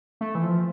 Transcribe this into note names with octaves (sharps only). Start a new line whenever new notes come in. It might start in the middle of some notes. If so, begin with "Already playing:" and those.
A3
E3
F3